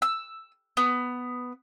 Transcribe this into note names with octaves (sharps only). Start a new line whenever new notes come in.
E6
B3